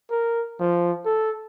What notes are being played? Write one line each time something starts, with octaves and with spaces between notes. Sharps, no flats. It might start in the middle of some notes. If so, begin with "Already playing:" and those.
A#4
F3
A4